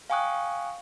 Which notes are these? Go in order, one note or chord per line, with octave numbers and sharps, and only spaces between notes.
F5 G5 G#5 C#6 D#6 F#6